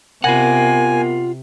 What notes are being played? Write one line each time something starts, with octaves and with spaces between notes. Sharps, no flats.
C3 B3 F4 A#4 F#5 G#5